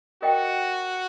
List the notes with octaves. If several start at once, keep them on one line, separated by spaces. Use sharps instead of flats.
F#4 A#4 D#5 G5